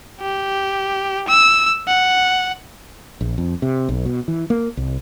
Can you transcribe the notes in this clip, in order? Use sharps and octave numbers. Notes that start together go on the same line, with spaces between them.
G4
E6
F#5
A#1
F2
C3
B1
B2
E3
A#3
C2